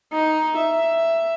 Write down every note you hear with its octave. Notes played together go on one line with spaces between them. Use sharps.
D#4
E5